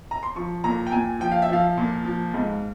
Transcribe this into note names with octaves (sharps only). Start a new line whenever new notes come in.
A#5
C6
F3 C#6
A#2 A#5
G5
A#2 G#5
F3 G5
F5
E5
F3 F5
A#2
F3
G#2